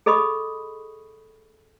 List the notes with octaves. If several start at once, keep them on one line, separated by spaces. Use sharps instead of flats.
G#4 A4 D#5 B5 C#6 D#6